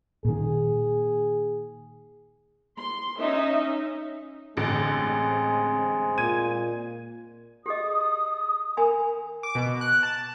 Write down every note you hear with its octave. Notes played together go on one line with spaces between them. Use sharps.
A#2 D#3 G#4
C6
C#4 D#4 D#5 E5
A1 D3 G#3 C4
A#2 G#6 D#7
G4 G#4 D#5 D#6
A#4 G#5 B5
D6
B2
F#6
A5